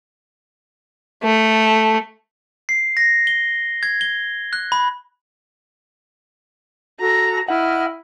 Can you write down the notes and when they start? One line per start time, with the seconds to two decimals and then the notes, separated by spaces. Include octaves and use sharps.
1.23 A3
2.69 C7
2.97 A#6
3.27 G7
3.83 G#6
4.01 G7
4.53 F#6
4.72 B5
7.00 F#4 A4 A#5
7.48 E4 D#5 F#5 F6